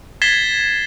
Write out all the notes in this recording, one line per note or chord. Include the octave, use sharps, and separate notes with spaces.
G#6 A6 B6 C7 E7 G7